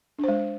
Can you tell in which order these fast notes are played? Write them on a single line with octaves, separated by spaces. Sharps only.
D4 C5 G#3